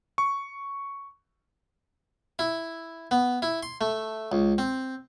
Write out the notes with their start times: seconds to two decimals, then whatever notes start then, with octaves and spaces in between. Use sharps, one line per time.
0.18 C#6
2.39 E4
3.11 B3
3.42 E4
3.63 C6
3.81 A3
4.32 C#2
4.58 C4